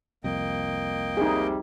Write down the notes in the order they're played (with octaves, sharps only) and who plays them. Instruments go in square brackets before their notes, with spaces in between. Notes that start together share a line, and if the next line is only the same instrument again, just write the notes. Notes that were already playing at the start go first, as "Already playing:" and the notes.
[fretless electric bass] C2 F2 [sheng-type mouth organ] A#3 D#5 G5
[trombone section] C3 G3 [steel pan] D#4 G#4